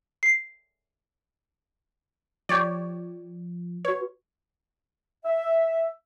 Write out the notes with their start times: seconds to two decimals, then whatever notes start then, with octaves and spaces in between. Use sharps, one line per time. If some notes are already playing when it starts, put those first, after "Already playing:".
0.23 C7
2.49 F3 G4 C#5 D5
3.85 F#4 B4 C#5
5.25 E5